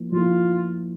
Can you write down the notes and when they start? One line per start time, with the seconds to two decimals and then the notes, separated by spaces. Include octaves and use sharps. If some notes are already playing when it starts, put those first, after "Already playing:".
Already playing: F3 A#3 E4
0.12 F3 A#3 E4 F4